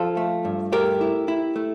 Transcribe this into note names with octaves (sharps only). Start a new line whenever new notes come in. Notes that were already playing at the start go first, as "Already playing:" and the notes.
Already playing: F3 F4 A4
A3
G2
A3 G4 A#4
E4
E4
A3